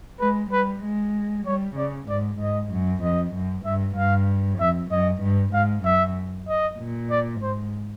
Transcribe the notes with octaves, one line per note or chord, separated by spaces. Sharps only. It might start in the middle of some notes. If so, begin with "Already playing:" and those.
G#3 B4
G3 B4
G#3
G3 C#5
C#3 D5
G#2 D5
G#2 D#5
F#2
F2 D#5
F#2
G2 E5
G2 F5
F2 E5
F#2 D#5
G2
G#2 F5
F#2 E5
D#5
A#2
D5
G#2 C5